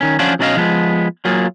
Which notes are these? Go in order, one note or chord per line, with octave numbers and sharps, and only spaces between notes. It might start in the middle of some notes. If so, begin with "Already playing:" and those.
D#3 C#4
F3 C#4 D4 F4 F#4
B1 F#3 C#4 D5 D#5 F5
F3 G#3 B3
F#3 A#3 F4 G#4